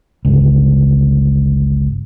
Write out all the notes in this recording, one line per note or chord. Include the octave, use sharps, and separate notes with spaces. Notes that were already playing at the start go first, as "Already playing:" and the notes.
G1 C#2